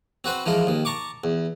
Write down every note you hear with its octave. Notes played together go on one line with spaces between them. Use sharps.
C4 F#4 B4 C5
E3 F3 G#3 A#4
D#2 D#3
A5 A#5 C#6 D6
E2